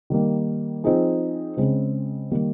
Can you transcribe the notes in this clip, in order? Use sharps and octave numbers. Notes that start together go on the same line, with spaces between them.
D#3 G3 A#3
F3 C4 D#4 G#4
C#3 G#3 C4
D#3 G3 A#3